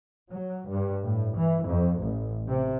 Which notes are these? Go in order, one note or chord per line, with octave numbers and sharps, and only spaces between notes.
F#3
G2
A2
E3
F2
A1
C3